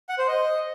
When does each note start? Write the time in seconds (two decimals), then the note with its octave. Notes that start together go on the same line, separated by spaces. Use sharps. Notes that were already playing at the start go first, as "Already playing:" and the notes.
0.09 F#5
0.19 C5
0.28 D#5